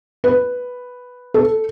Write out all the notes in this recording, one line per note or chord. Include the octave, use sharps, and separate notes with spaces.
B4
A4